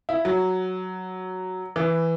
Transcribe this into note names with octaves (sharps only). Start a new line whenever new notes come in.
E4
F#3
E3